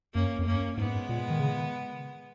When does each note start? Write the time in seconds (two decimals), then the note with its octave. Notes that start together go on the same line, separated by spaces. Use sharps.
0.14 F#2 A#3 C#4
0.39 F2
0.46 F#2 A#3 C#4
0.77 G#2 G#3 B3
1.09 A#2
1.30 D#3
1.40 C#3